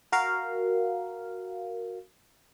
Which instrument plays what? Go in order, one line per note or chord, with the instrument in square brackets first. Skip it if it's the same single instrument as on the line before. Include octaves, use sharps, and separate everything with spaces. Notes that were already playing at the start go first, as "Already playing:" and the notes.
[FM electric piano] F#4 A#4 F5